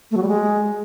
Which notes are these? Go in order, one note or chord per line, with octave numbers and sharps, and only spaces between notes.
A3
F#3
G3
G#3